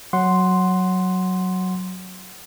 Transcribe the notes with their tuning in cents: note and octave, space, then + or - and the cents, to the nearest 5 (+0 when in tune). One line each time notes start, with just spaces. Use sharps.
F#3 +0 F#5 +0 C6 +0